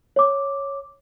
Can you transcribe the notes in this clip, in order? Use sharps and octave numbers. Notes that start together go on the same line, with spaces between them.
C#5 D6